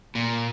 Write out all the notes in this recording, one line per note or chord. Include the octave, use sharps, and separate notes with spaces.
A#2